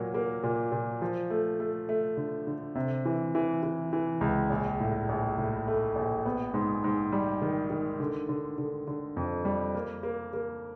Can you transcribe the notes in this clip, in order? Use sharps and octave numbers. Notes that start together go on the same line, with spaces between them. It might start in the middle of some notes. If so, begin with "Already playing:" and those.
Already playing: A#2 F#3 A#3
A#3
A#2
A#2
F3
A3
A3
A3
D3
D3
C3
E3
E3
E3
E3
C#2
A#1
A2
A#1
A2
A3
A#1
B3
G#2
G#2
G3
D#3
D#3
D3
D3
D3
D3
F2
G3
A#3
A#3
A#3